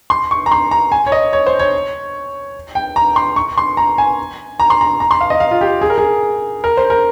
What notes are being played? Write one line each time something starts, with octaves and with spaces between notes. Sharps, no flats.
C6
C#6
A#5
C6
A#5
G#5
C#5
D#5
C#5
C5
C#5
G5
A#5
C6
C#6
C6
A#5
G#5
A#5
C6
A#5
A#5
C6
F5
D#5
F5
F4
G4
G#4
A#4
G#4
A#4
C5
A#4